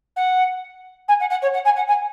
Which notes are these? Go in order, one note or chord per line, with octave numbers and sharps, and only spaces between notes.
F#5
G#5
F#5
F#5
C#5
F#5
G#5
F#5
G#5